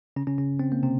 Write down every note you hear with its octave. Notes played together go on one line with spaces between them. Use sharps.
C#3 C#4
C#3 C#4
C#3 C#4
C4
A#3
C3 C4